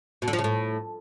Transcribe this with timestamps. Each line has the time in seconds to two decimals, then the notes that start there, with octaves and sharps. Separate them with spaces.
0.22 B2
0.28 D3
0.33 F3
0.39 C#3
0.44 A2